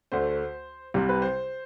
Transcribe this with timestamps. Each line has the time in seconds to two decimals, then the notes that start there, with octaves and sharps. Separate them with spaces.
0.12 D2 D3 A3 C5
0.94 C2 C3 G3
1.09 B4
1.22 C5